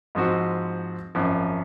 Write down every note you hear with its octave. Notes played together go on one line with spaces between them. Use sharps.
G#2 F3 C4 F#4
G#1 F#2 F3